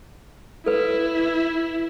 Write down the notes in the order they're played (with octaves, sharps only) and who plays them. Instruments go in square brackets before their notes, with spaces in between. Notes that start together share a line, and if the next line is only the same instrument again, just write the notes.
[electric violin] E4 [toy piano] A4 B4